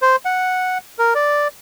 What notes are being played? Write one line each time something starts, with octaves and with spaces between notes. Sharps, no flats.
C5
F#5
A#4
D5